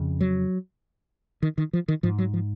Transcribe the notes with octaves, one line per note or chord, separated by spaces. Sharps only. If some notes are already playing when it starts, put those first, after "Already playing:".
Already playing: F2 C#3
F#3
D#3
D#3
F3
D#3
G#2 F3
F#3
F3